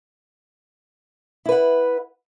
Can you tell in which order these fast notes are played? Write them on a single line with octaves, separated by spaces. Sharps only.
E4 B4 F#5